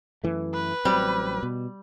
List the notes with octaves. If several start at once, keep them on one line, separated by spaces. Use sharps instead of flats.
F#2 E3 A3
B4
A1 F#3 G3 C4
B2